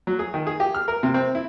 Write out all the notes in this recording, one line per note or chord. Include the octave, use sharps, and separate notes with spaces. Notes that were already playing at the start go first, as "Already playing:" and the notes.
F#3
G#4
D#3
G#4
G4
F6
A#4
C3
C4
E4